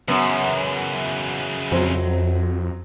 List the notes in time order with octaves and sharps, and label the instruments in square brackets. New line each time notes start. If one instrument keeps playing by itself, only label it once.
[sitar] F#2 [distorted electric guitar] C#3 E3 [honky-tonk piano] B3
[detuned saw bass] F2 [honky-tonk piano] F#3 C4